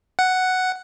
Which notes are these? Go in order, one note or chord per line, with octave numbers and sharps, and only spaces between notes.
F#5